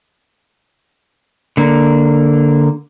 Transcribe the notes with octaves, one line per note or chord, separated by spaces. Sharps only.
D3 A#3